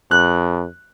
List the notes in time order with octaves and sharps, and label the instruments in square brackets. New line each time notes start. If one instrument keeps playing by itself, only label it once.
[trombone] F2 [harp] F#6